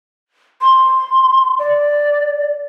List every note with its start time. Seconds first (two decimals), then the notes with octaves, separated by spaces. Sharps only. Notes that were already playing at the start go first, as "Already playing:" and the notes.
0.61 C6
1.59 D5